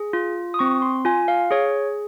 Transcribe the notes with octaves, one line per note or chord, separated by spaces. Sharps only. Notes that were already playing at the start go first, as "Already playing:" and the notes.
Already playing: G#4
F4
D#6
C4 C#6
C6
F4 G#5
F5
G#4 C#5